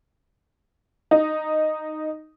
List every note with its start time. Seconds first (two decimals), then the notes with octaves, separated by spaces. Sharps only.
1.11 D#4